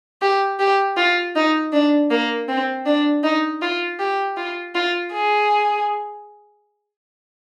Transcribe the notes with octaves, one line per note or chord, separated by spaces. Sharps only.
G4
G4
F4
D#4
D4
A#3
C4
D4
D#4
F4
G4
F4
F4
G#4